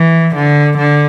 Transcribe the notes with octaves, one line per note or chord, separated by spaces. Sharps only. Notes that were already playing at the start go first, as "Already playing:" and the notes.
Already playing: E3
D3
D3